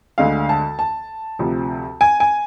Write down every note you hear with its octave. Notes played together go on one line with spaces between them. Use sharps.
D2 D3 G#3 F5
A5
A5
D2 C3 F3
G#5
G#5